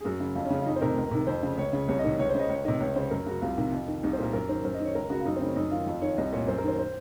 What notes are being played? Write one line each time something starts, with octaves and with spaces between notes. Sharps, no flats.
G#4
F#2 F#4
C#3
F2 F4
C#4
C#3
C#4
F4
F2 D#4
C5
C3 D#3 A#4
C#2
C3 D#3
F2 C5
C#3
C#2 C#5
C#3
C2 C#5
D#5
C3 D#3 C#5
C#2 C#5
C5
C#3 D#5
C#2 C#5
C3 D#3 D#5
C#2 C#5
C#3 C5
F#2 A#4
C#3 F#4
C2 F4
C3 D#3
F2
D#3
C2 D#4
C5
A#2 A#4
F#2 A#4
D#3 C5
F#2 C5
D#5
D#3 C#5
C#2 A#4
C#3 F#4
F4
F#2 D#4
C4
C#3
C#4
F#2 D#4
D#3 F4
F2 F4
D#3 C#5
C2 D#5
A#2 C#5
F#2 C5
A#4
D#3 C5
C5